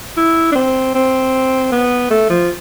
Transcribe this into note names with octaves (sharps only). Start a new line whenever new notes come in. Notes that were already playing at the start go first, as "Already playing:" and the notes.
E4
D4
C4
C4
B3
A3
F3